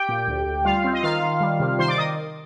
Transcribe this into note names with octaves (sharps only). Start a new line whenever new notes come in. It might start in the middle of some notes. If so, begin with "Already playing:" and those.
Already playing: G4 G5
A#2
D2
D2
G3 F4 F5
C4
D#5
D#3 F4 F5
D#3
G3
C3
D#3 C5 C6
D5 D6
D#3 D#5 D#6